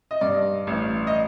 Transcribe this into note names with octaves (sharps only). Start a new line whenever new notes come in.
D#5
G2 D5
A1
D#5